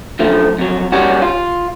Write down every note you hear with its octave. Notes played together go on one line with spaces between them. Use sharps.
F#2 D3 F3 A3
F2 F#3
G3 C#4 F#4
F4